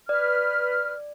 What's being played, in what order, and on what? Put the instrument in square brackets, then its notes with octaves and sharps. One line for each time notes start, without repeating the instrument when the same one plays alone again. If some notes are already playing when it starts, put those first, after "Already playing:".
[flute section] B4 F6 [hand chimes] D5